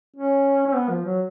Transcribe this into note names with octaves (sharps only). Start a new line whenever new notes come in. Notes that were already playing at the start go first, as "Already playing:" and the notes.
C#4
C#4
B3
F3
F#3